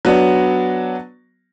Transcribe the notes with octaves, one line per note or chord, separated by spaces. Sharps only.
F#3 B3 D4